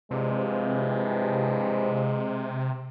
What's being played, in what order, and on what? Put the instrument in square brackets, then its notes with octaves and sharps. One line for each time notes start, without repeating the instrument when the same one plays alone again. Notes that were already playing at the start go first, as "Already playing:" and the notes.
[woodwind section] G2 E3 F3 [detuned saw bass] C3 [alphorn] G#3